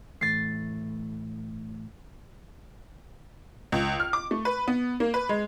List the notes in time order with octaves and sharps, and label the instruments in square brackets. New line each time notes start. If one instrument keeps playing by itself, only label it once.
[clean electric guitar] A2 E3 A3 [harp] A6 C7
[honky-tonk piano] C#2
F6
D6
A3
B4
B3
A#3
B4
G#3